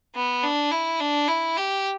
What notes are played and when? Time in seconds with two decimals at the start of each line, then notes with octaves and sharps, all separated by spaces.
0.16 B3
0.43 D4
0.71 E4
1.01 D4
1.28 E4
1.57 G4